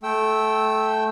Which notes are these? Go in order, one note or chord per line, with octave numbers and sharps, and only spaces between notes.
A3 G5 E6